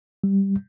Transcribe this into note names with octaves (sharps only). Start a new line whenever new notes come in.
G3